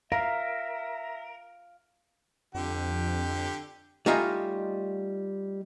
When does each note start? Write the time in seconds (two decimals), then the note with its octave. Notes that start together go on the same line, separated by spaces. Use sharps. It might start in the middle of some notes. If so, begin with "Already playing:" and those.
0.12 A#4 E5 F5
2.55 F2 D3 G4
4.06 G3 A3 D#4 F4 D#5 G#5